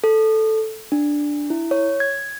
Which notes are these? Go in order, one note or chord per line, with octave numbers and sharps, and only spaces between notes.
A4
D4
E4
C#5
G#6